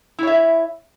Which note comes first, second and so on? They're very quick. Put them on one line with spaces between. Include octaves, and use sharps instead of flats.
E4 C#5 E5